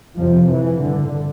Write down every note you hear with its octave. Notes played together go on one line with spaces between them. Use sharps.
F2 C3 F3
E3
G2 D3